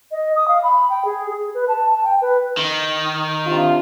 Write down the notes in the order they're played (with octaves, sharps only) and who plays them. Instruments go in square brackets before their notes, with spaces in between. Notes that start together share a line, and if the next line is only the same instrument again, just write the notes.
[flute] D#5
D#6
F5
B5
G5
G#4
G#4
B4
A5
A5
G5
B4
[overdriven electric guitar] D#3
[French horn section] C3 D4 F4